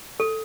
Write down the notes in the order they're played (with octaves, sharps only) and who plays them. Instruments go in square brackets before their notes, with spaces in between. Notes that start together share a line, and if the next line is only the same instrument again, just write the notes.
[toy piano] A4